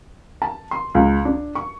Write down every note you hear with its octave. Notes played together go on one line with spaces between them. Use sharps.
A5
C6
C#2
D4
C#6